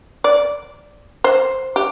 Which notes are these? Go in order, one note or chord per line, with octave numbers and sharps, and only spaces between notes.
D5
C5
G4